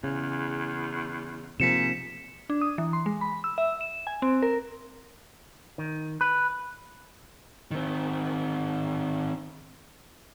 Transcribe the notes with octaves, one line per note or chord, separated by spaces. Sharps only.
E2 C#3
G#2 C3 F3 A#3 B6 C#7 E7
D4
D#6
E3
C6
G#3
B5
E6
E5
E7
G#5
C4
A#4
D#3
B4
D#3 C4